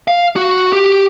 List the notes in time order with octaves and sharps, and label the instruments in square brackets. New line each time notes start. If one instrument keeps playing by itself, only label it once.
[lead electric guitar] F5
F#4
G4